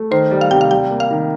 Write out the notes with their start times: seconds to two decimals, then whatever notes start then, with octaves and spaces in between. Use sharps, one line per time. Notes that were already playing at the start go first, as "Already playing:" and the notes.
Already playing: A3
0.11 D#3 C5
0.31 G3
0.41 F5
0.51 C3 G5
0.61 F5
0.71 G3 G5
0.91 A#3
1.00 F5
1.11 D#3